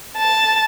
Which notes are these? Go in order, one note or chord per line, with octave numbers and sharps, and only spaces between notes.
A5